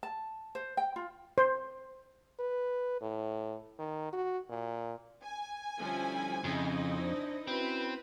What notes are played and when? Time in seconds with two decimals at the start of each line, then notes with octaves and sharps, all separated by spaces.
0.03 A5
0.55 C5
0.77 G5
0.96 F4
1.38 C5
2.40 B4
3.01 A2
3.79 D#3
4.13 F#4
4.50 A#2
5.22 G#5
5.80 D3 F3 G3 C#4 E4
6.44 F2 C#3 D#4 E4 D#5
7.00 D4 C5
7.47 C4 C#4 E4 F#4 B4